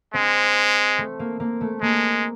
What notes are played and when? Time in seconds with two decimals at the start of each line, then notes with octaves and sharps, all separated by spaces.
0.14 G#3 C4
0.98 A3
1.19 A#3
1.40 A#3
1.61 A3
1.82 G#3 A#3